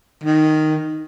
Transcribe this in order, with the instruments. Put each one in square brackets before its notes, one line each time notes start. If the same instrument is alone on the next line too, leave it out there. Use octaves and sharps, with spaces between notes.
[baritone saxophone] D#3